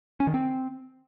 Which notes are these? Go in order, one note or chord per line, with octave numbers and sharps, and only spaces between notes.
C#4
D#3
C4